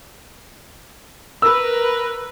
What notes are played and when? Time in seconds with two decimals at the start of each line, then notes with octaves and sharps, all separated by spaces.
1.42 A#4 B4 E6